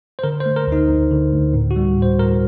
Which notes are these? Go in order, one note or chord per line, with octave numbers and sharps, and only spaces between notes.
C5
D3 A#4
C5
A3
A#4
D2 D#4
D2
D3
D2
A2
F#4
G3
A2 C5
A2 A#4